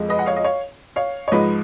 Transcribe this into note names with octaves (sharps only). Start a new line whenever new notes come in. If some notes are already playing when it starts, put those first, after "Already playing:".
Already playing: F2 F3 G#3
B4 D#5
F#5
C#5 F5
D#5
C#5 F5
C#5 F5
C#5
G#2 F3 G#3 B4 D#5